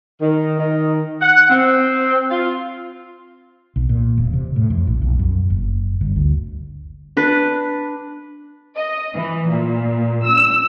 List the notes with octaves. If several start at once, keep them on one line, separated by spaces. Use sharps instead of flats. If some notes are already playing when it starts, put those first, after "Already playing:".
D#3
D#3
F#5
C4
F4
B1
A#2
E1
C3
A2
F2
A#1
B1
F#2
F#1
G1
D2
D4 B4
D#5
E3
A#2
E6